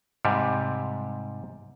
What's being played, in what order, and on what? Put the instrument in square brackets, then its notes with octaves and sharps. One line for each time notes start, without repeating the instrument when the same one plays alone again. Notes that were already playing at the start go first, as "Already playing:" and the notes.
[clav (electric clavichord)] G#2 C3 G3